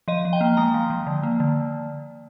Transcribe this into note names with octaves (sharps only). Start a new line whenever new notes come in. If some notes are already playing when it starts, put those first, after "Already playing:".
F3 D#5
F3
G5
A#3
G#3 A#5
F3
F3
D3
A#3
D3